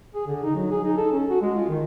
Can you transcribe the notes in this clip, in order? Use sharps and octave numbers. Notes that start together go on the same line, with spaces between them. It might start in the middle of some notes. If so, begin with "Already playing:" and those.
G#4
D3
D#4
F#3
G#4
D#4
A4
C#4
F#4
G#3
F4
D#3